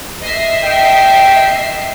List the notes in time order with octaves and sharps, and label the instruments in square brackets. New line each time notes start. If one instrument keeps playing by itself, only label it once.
[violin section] D#5 E5 C7
[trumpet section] G5